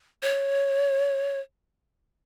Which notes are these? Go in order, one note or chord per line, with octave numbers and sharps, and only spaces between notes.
C#5